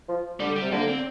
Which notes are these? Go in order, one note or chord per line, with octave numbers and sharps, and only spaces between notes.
F3
D3 G3
G3
C3
D3 A#3
C4